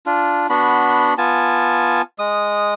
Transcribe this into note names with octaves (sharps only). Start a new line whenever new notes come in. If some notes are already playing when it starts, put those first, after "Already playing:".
D4 F4
B3 D4 F#4 B5
B3 F4 G#5 A5
G#3 D#6